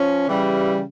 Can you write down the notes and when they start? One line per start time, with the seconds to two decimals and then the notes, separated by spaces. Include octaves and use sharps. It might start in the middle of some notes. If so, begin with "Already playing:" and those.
Already playing: F3 C#4
0.27 C#3 E3 G3